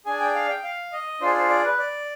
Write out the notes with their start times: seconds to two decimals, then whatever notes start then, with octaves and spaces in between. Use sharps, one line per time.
0.06 D4 G#4 G#5
0.20 G5
0.35 F5
0.49 G5
0.64 F5
0.92 D#5
1.21 D4 F4 G#4 C5
1.35 C5
1.50 D5
1.64 B4
1.78 D5